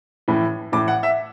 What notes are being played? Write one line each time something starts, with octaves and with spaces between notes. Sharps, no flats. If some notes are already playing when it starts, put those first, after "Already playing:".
A2 E3
A2 E3 D6
F#5
E5